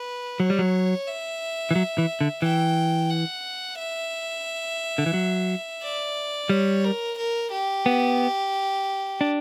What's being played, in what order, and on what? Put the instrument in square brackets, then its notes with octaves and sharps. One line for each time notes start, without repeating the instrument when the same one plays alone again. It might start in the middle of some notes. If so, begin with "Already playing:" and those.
Already playing: [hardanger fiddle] B4
[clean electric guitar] F#3 [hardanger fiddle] C#5
[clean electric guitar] G3
F#3
[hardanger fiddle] E5
[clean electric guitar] E3
F#3
E3
D3
[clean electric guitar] E3 [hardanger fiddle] G5
[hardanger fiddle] F#5
E5
[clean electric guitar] D3
E3
F#3
[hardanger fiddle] D5
[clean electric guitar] G3 [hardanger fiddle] C#5
[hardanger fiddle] A#4
A#4
G4
[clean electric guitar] B3
D4